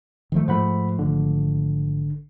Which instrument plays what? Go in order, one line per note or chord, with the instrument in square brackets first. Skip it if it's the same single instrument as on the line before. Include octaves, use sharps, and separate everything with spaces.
[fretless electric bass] D#3 F3 A3
[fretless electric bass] G#2 F3 A3 [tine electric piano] C5 F#5 B5
[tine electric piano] G#1 D3